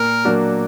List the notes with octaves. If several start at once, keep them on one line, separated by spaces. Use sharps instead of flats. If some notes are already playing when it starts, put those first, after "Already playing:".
Already playing: A#2 A#4
F#3 A#3 D4 F#4